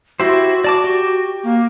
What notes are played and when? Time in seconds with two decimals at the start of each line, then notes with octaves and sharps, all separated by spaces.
0.20 E4 F#4 G4 C5
0.64 D5 A5 D6
0.84 G4
1.44 A#3